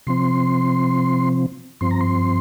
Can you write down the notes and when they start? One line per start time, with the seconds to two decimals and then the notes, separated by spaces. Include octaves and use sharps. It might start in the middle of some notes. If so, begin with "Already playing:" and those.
0.07 C3 F3 C4 C6
1.81 G2 F3 C4 C6
1.91 A#5
2.01 C6